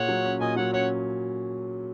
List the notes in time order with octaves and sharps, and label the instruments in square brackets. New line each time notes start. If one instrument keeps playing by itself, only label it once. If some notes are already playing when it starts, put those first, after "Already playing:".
Already playing: [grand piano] A#2 G#4 [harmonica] C#5 F#5
[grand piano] F#3
C#4
[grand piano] A#2 [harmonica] D#5 G#5
[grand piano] F#3 [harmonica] C#5 F#5
[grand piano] C#4 [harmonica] C#5 F#5